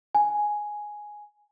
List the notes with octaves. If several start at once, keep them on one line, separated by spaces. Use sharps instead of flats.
G#5